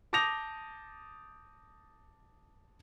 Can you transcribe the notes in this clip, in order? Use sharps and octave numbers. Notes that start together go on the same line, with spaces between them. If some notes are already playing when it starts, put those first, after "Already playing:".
A5 D6 D#6 G6 A#6 F7